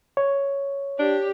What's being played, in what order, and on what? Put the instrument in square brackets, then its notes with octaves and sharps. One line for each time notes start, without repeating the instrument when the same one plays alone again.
[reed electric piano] C#5
[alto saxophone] D4 [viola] G4